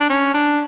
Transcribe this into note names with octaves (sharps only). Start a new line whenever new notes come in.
D4
C#4
D4